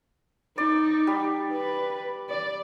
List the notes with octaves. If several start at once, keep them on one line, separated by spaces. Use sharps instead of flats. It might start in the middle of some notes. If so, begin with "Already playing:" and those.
D#4 D5
G3
B4
D5